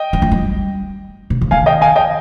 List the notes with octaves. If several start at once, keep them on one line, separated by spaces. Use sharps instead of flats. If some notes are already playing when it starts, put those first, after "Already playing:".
Already playing: D#5 G5
G3
F3
G3
C3
C#3
D#3 F5 G#5
D#5 G5
F5 G#5
D#5 G5